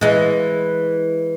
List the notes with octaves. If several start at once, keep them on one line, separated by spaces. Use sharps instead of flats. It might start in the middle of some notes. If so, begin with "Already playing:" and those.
E3 G#3